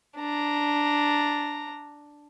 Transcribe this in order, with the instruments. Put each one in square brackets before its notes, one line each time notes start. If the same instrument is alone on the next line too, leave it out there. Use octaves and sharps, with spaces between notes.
[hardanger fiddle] D4 A#5